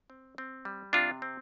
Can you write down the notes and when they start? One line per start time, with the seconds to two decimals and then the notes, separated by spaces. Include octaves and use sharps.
0.10 C4
0.38 C4
0.65 G3
0.93 C3 D4 F4
1.22 C4